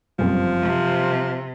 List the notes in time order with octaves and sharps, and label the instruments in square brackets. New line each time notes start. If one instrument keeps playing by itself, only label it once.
[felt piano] F#1 G2 C4 [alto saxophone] F3
[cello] C3